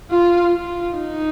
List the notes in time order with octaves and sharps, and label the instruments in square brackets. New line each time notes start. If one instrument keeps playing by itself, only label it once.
[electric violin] F4
F4
D#4